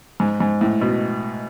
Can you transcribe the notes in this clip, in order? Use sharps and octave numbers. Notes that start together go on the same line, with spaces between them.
G#2
G#2
A2
B2